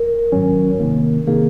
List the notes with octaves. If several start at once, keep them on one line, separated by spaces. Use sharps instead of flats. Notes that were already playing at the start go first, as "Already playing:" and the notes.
Already playing: A#4
G#2 D#3 F#3 C#4
C3 D#3 A#3
C3 D#3 A#3 G#4